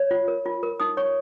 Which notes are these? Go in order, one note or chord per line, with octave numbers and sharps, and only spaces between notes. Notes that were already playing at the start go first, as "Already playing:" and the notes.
Already playing: C#5
F4
A#4
F4
A#4
D#4 D#6
C#5 C#6